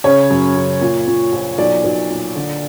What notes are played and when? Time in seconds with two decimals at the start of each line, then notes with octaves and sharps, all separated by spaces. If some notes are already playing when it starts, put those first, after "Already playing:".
0.04 C#3 C#5
0.31 F#2
0.55 C#3
0.81 A#2
1.08 A#2
1.32 A#1
1.58 B1 D5
1.84 B1
2.10 A#2
2.35 D3